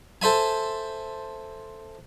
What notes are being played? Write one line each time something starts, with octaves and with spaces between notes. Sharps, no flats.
A4 C5 E5 G#5